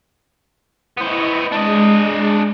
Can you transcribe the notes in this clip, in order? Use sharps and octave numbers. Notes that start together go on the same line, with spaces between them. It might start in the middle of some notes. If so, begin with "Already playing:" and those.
B3 E4 C5 D#5 C#6
G#3 D4 D#5